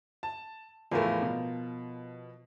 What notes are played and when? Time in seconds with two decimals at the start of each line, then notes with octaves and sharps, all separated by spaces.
0.23 A5
0.91 E2 A2 F3 A3 F4 A#4
1.22 B2